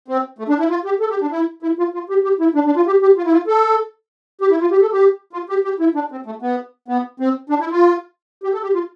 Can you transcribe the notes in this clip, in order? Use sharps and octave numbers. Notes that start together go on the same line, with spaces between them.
C4
A3
D4
E4
F4
G4
A4
G4
D4
E4
E4
F4
F4
G4
G4
E4
D4
D4
F4
G4
G4
F4
E4
F4
A4
G4
E4
F4
G4
A4
G4
F4
G4
G4
E4
D4
C4
A3
B3
B3
C4
D4
E4
F4
G4
A4
G4
F4